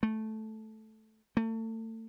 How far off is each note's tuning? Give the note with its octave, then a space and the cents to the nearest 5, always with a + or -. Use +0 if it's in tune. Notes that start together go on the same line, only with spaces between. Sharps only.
A3 -10
A3 +35